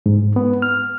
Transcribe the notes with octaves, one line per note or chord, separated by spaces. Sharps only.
G#2
B3
F6